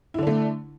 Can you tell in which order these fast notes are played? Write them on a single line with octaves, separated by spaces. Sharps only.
E4 D3 D4 A3